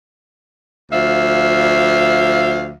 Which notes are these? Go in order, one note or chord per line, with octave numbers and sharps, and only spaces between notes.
D2 F3 E5 F5